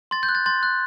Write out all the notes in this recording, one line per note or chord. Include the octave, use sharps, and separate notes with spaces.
C6 A6
G6
F#6
A6
C6 A6
F#6